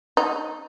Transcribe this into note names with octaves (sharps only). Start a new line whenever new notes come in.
D#4